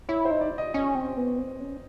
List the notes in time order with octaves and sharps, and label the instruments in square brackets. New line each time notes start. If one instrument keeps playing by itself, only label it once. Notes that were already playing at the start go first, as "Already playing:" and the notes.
[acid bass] E4 [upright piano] C#5
[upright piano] C5
[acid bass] D#4
[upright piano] D5
D#5
[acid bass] C#4 [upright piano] D#5
[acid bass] C4
B3
C4
C#4